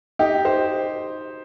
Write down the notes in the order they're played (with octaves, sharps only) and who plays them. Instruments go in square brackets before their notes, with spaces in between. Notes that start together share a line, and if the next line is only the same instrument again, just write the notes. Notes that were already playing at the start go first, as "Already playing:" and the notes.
[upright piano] D#4 G4
G4 C5